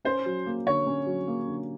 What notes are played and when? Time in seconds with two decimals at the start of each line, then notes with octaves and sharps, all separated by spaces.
0.05 C#4 C5
0.26 F#3
0.46 A#3
0.66 D3 C#5
0.87 C#4
1.06 F#3
1.27 A#3
1.47 D3